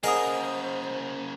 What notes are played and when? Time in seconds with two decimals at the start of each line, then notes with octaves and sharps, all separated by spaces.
0.04 C#3 A#3 G#4 A#4 C5 D#5 F#5 D#6